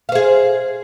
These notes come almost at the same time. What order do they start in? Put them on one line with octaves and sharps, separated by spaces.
F5 C5 G#4